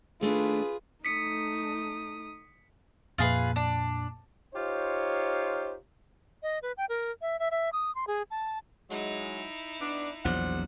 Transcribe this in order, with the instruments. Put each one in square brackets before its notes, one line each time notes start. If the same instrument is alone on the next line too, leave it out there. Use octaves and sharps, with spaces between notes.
[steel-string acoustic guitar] D#2 A3 D4 [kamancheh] F4 B4 [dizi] G#4
[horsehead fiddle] A3 D#4 [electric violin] D#6 [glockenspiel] B6 C#7
[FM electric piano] F2 A#2 [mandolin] F4 G#4 B4
[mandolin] D4
[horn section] D#4 F4 G4 C5 C#5
[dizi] D#5
B4
G5
A#4
E5
E5
E5
D#6
C6
G#4
A5
[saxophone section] F#3 G#3 [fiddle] D#4 E4
[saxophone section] B3 D4
[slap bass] A#1 E2 F#3 [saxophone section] C5 D5 F#5